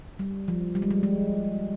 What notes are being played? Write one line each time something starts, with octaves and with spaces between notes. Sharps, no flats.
G3
F3
G3
G#3
G3
G#3